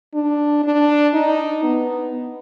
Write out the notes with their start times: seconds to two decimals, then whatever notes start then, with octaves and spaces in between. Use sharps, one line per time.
0.14 D4
0.64 D4
1.14 D#4
1.63 B3